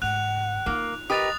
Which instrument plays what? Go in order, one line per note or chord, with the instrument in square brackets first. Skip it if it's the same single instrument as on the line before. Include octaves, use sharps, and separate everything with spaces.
[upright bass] G#2 C#3 [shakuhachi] F#5 [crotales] F#6 F7
[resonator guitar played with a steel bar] A#3 [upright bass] D#4 F4
[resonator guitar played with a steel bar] G4 A#4 B4 [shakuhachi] D#5 [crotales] D#6 A6 F7